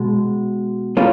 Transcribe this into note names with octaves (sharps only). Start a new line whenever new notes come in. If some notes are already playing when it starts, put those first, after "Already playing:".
Already playing: B2 G#3
A#2 G3 A#3 C#4 F4